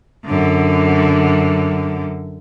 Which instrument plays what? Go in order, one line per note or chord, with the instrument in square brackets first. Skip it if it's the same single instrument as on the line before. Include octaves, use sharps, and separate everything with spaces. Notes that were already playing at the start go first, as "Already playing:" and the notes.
[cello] F#2 D3